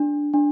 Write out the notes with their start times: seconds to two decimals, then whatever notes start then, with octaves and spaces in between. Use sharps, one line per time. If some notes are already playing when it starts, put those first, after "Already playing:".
Already playing: D4
0.34 D4